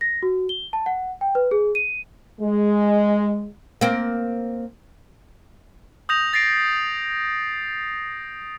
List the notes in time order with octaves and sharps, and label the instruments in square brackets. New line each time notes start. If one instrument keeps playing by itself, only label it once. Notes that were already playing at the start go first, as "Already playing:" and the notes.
[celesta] A#6
F#4
G7
A5
F#5
G5
B4
G#4
D#7
[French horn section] G#3
[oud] A#3 C4
[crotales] D#6 G6 A#6 F7
A6 A#6 C7 D7